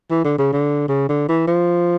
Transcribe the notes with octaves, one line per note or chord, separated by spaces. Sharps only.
E3
D3
C#3
D3
C#3
D3
E3
F3